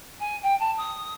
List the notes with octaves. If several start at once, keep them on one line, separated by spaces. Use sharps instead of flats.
G#5
G5
A5
D#6